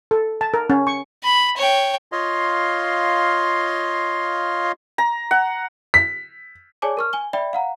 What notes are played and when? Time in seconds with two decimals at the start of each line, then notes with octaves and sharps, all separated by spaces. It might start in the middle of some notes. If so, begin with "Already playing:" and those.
0.11 A4
0.41 A5
0.54 A#4
0.70 C#4
0.87 C#6
1.24 B5
1.57 C#5 G5
2.12 F4 C#5 D#5 F5 C6
4.98 A#5
5.31 F#5
5.94 B6
6.82 G#4 C#5 D5 G#5 A5 D6
6.97 A#4 C#6 F6
7.13 G#5 G7
7.33 D5 E5 G5 B5
7.53 F5 F#5 A#5